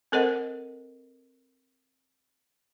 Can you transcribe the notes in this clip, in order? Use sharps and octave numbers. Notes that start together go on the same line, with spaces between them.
C4 A4 A#4 C5 D#5 F#5